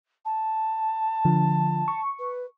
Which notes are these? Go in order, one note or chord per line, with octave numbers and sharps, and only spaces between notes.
A5
D3 F3
C#6
B4